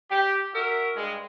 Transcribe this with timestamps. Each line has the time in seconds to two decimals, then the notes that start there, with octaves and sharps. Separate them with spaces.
0.11 G4
0.54 F#4 A#4 E5
0.96 G2 G#3